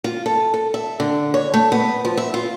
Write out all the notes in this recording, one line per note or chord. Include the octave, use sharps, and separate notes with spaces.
F4
A4
A4
E5
D3
C#5
A3
B3
F3
E5
F4